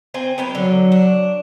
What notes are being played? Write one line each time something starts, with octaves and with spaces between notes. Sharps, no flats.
C4 C5 G#5
F#3 B3 G5
D3 F#3
D4